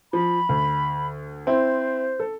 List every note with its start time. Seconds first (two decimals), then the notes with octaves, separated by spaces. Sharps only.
0.13 F3 B5
0.49 D2
1.47 C4 E4 C5
2.20 A4